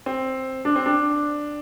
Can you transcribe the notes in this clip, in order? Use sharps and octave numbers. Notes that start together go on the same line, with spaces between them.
C4
D4
C4
D4